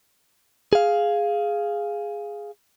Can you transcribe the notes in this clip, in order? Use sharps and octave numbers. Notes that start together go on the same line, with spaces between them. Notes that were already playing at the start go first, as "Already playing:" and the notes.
G#4 F5